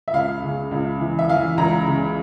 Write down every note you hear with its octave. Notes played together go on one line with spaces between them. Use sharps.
E5
C#2 F5
C#3
C#2
E3
E5
E3 F5
C#2 A#5
C#3